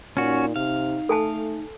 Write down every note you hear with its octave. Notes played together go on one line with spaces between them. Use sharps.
A#2 C#4 D#4 F#4
C3 F5
A3 A4 G#5 A5